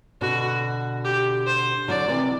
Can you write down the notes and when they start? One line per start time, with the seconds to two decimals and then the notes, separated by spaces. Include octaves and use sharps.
0.21 B2 D3 F#4
1.04 G4
1.47 C5
1.88 D3 F#3 D5
2.08 C3 E3